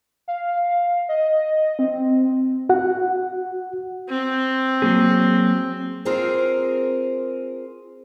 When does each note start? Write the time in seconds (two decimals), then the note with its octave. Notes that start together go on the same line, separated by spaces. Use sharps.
0.28 F5
1.09 D#5
1.79 C4
2.69 F#4 F#5
4.09 C4
4.82 F#3 A#3 G#4
6.05 C4 F4 G#4 A#4 C5